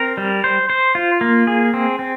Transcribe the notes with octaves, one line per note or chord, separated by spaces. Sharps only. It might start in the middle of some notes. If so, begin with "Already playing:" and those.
Already playing: C4 A#4
G3
C5
C5
F4
A#3
G#4
C4
C4